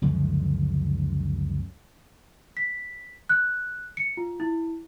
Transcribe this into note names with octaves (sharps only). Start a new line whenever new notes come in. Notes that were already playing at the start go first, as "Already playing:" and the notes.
C#2 F#2 D3 F3
B6
F#6
C#7
F4
E4